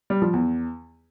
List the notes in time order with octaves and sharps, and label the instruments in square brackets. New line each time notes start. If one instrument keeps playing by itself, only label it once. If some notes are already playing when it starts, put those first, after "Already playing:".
[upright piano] G3
F3
E2